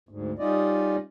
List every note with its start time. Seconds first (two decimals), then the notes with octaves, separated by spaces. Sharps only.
0.09 D2 G#2
0.39 G3 C#4 D#4 F4 D5 D#5